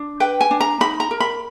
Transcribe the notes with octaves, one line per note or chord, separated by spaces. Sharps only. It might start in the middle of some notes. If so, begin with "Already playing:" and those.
Already playing: D4
B4 G5
G#5
D4
A#5
D#4 B5
A#5
A#4
B5